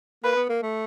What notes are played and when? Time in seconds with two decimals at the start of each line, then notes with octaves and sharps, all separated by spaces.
0.24 A#3 B4
0.36 B3
0.49 A#3
0.62 A3